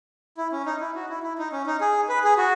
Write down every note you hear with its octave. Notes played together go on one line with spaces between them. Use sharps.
E4
C#4
D#4
E4
F#4
E4
E4
D#4
C#4
D#4
G#4
B4
G#4
F#4